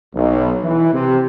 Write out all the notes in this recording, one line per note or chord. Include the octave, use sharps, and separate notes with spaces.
B1
E3
C3